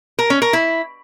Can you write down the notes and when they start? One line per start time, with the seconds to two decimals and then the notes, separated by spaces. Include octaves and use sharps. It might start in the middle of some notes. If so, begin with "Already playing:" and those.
0.19 A#4
0.30 C#4
0.42 A#4
0.53 E4